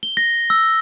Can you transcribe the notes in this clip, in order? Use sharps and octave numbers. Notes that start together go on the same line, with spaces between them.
G7
A#6
E6